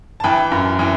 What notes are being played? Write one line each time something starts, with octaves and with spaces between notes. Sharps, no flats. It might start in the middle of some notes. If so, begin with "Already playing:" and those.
A5
E3 G5 B5
F#2
E3